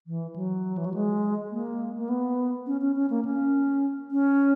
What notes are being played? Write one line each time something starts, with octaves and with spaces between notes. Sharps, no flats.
E3
F#3
E3
F#3
G#3
A#3
A#3
B3
C#4
C#4
C#4
A#3
C#4
C#4